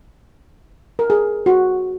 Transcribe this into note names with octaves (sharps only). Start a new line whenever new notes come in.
A#4
G#4
F#4